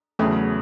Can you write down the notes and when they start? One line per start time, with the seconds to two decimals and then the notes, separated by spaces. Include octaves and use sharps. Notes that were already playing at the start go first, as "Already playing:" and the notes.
0.19 E2 C#3 F#3 A3